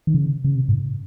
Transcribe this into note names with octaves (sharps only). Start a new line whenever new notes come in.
D#3
C#3
C#3
C3
G#2